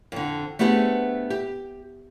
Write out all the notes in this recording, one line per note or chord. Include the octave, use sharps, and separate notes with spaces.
F2 D3
A3 B3 D4 G4 G#4 C5
G4